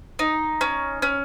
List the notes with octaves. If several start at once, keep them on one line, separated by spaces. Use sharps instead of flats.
D#4
C#4
C#4